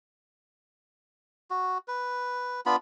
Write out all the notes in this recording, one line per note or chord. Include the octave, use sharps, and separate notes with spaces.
F#4
B4
B3 D4 F4 B5